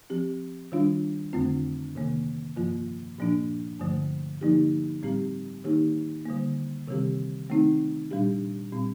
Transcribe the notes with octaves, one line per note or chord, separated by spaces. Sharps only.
F3 C4 G4
D#3 G3 D4 F4
F2 D3 A3 C4 F4
C3 D#3 A#3
G2 F3 A#3 F4
A#2 F3 A#3 D4
G2 D3 F3 A3
D3 F3 A#3 D#4 G4
A2 G3 C4 G4
D#3 A#3 D#4 G4
D3 G3 A#3
C3 D#3 G3 C4 G4
D#3 A3 C4 D#4
A#2 G3 D4 G4
A#2 G3 C4